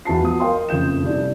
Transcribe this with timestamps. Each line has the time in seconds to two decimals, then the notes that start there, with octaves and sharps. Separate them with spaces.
0.05 E2 F#4 A5 C7
0.21 F3 B3 F#4 D#6
0.40 A#4 D#5 F5 G5 C6
0.69 F#1 F2 G6 E7
1.03 G2 C3 D4 E4